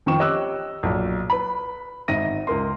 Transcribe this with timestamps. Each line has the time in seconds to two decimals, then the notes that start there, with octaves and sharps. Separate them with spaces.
0.06 F2 D#3 F3 G5 C#6 E7
0.19 G4 C#5 D#5 D6 E6 F#6
0.83 B1 A#2
1.30 B4 B5
2.08 G#1 D#4 E5 A#6 D#7
2.47 C#2 A#4 C6